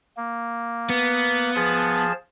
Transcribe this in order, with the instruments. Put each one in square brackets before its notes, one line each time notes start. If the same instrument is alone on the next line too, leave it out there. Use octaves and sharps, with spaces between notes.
[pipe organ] A#3
[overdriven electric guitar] B3
[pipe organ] F3 G#4 A5